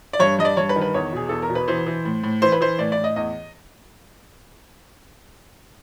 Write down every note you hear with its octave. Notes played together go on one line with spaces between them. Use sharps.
D5
G2 C#5
G2 D#5
D5
G2 C#5
B4
D#3
B4
E2 C#5
B2 G#4
E2 A4
A#4
B2
B4
E3 C5
E3
A2
A2
E3 C5
B4
E3 C5
A2 D5
D5
A2
D#5
E2 D#5